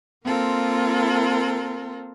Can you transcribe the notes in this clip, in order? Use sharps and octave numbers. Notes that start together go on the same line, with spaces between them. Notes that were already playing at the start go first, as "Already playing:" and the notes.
A#3 C4 F4 A4 A#4